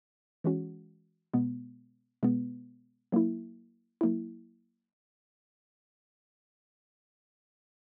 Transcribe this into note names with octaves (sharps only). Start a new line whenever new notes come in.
E3 G#3 C#4 F#4
B2 G#3 B3
B2 G#3 B3
F#3 A#3 E4
F#3 A#3 E4